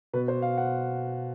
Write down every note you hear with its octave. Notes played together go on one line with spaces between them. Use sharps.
B2 B4
C5
F5
F#5